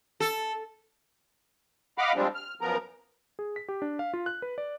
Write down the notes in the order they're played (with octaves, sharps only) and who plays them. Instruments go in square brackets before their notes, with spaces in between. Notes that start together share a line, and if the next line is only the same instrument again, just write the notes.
[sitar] A4
[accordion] D#5 F5 F#5 B5 D6 F6
F3 G3 G#3 C4 D4
F6
F#2 F3 B3 A#4 A#5
[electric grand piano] G#4
B6
G4
D4
F5
F4
F#6
B4
D5